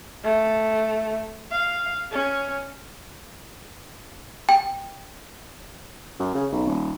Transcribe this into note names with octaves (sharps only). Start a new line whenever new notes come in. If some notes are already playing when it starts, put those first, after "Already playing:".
A3
F5
C#4
G5
F#2
C#3
B1
D#1